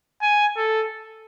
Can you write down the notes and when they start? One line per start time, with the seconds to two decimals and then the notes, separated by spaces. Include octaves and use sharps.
0.22 G#5
0.57 A4